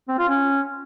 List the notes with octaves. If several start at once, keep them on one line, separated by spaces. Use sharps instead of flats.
C4
F4
C#4